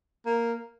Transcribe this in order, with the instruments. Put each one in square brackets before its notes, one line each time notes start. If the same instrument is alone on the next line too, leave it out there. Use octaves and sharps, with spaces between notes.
[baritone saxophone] A#3